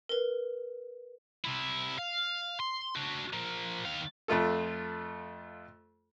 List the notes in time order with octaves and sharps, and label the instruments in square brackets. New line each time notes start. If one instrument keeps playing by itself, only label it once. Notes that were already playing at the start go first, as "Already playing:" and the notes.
[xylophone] A#4 B4
[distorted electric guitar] C3 E4
F5
C6
D4 F#4
F3 A#3
D#3 F5
[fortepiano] F2 A3 F4 A4